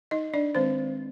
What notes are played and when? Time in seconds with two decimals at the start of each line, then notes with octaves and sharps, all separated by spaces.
0.11 D#4 D#5
0.34 D4 D5
0.55 D#3 G#3 C4 C5